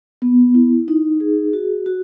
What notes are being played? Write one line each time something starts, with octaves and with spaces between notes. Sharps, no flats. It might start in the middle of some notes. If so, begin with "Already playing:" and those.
B3
E4
D#4
G#4
F#4
F#4